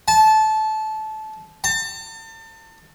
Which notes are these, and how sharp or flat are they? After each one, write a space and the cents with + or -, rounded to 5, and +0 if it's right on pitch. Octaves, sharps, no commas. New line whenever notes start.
A5 -20
A5 +35